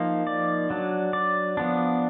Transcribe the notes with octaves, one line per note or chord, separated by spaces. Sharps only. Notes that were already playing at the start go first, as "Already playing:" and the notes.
Already playing: F3 A#3 D#4
D5
F#3 D4
D5
F3 B3 D4